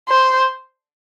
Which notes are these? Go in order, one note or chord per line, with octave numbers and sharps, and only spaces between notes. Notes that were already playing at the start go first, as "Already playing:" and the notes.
C5